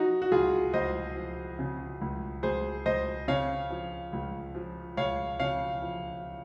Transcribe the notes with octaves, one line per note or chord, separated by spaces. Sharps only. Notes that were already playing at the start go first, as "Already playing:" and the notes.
Already playing: F3 D#4 F#4
F#4
C#2 F4 G#4
C#2 C5 D#5
F3
C#3
C#2
C#2 G#4 C5
C#2 C5 D#5
C#3 C#5 F5
F3
C#2
F3
C#2 C#5 F5
C#3 C#5 F5
F3